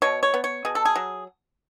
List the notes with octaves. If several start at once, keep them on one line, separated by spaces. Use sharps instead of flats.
B2 C#5
C#5
B3
C#5
B2 G#4
A4
G#4
F#3